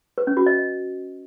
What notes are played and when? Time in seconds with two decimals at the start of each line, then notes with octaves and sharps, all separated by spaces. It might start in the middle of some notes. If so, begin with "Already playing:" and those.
0.18 B4
0.27 C#4
0.37 F#4
0.46 D#5